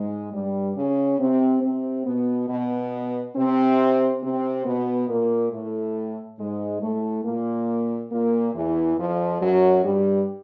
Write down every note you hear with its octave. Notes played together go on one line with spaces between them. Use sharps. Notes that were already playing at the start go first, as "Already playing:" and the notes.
Already playing: G#2 G#3
G2 G3
C#3 C#4
C3 C4
C3 C4
B2 B3
B2 B3
C3 C4
C3 C4
B2 B3
A#2 A#3
A2 A3
G#2 G#3
A2 A3
A#2 A#3
A#2 A#3
E2 E3
F2 F3
F#2 F#3
G2 G3